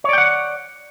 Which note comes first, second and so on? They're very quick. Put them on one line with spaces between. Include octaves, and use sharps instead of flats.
C#5 D5 G5 F#5